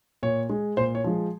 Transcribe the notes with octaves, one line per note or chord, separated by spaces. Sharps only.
A#2 C#5
G#3
A#2 C5
C#5
F3 G#3